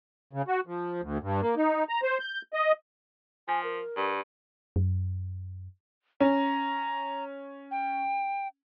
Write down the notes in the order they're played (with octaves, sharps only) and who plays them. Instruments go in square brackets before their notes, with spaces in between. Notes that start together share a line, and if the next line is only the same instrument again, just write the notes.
[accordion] C#3
F#4
F3
D2
G2
A#3
D#4
A#5
C5
G6
D#5
[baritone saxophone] F3 [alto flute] G#5
[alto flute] A#4
[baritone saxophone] G2
[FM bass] F#2
[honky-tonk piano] C#4 [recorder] A#5
[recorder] G5